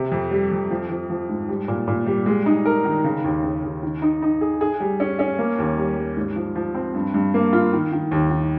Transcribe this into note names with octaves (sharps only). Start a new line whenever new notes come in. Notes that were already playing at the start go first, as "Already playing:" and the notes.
Already playing: C3
F2
G3
F2
F3
F3
F3
G#2
G3
A#2
A#2
G3
G#3
D#4
A#4
D#3
C#3
D#2
C#3
D#2
D#3
D#4
D#4
G#4
G#4
G3
C#4
C#4
A#3
D#2
G3
G3
G#2
F3
F3
C4
G2
G2
A#3
F4
D#3
D#3
D#2
D#3